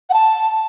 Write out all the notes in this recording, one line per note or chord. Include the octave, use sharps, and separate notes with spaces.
F#5
A5